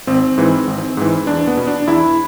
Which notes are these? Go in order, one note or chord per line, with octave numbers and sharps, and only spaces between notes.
G#1 C4
G#2 E3
G#1
G#2 E3
E2 D4
B3
B2
D4
E2 E4